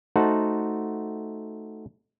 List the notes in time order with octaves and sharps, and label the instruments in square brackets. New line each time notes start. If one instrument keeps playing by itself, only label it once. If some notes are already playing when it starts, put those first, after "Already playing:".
[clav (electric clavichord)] A3 D#4 F#4 C5 F#5 A5